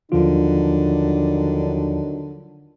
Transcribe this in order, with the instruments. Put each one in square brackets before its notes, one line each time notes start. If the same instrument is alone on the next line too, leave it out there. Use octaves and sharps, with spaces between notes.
[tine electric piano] D#2 F3 F4 [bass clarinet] D3 [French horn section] D#3 F#3 D4